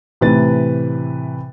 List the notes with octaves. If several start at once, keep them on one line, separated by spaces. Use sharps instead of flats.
A2 C3 E3 B4 A6